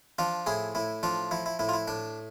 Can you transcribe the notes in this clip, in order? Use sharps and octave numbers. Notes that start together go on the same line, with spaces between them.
F3 D4 F4
A2 E4 G#4
A2 E4
F3 D4 F4
F3 E4
E4
A2 E4
F4
E4
A2 D4